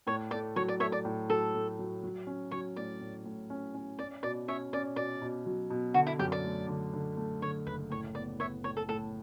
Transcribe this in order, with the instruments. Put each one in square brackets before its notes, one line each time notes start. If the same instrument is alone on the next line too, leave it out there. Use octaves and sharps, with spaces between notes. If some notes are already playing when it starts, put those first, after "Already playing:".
[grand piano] A2 [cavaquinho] C#5
[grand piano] A3 [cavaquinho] D5
[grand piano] F#3 [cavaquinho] C#5
[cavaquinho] D5
[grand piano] A3 [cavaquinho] C#5 E5
[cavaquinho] D5
[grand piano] A2
[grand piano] F#3 [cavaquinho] A4
[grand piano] A3
F#3
F#3
C#4
[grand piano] F#3 [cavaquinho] C#5
[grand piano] A2 [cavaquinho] D5
[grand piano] A2
A2
C#4
C#4
[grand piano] C#4 [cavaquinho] D5
[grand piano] B2 [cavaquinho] D5
[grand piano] C#4 [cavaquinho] C#5 E5
[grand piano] C#4 [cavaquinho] D5
[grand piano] B2 [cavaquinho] D5
[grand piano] B2
F#3
B2
[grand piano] D3 [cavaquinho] F#4
[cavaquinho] E4
[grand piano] F#2 [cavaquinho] G4
[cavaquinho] D5
[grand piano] A3
D3
D3
A3
[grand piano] D3 [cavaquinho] C#5
[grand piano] F#1 [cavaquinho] B4
[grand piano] A2 [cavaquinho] C#5
[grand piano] B3 [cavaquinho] D5
[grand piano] B3 [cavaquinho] C#5 E5
[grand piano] A2 [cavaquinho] C#5
[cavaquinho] A4
[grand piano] A2 [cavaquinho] A4